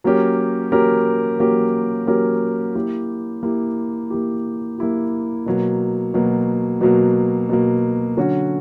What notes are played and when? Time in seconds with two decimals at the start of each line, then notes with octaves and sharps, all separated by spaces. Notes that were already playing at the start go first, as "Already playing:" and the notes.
0.04 F#3 A#3 C#4 G4 A#4
0.72 F#3 A#3 C#4 G4 A#4
1.40 F#3 A#3 C#4 G4 A#4
2.07 F#3 A#3 C#4 G4 A#4
2.75 A#3 E4 G4
3.43 A#3 E4 G4
4.10 A#3 E4 G4
4.78 A#3 E4 G4
5.46 B2 F#3 A#3
6.14 B2 F#3 A#3
6.81 B2 F#3 A#3
7.49 B2 F#3 A#3
8.17 D3 F#3 C#4 F#4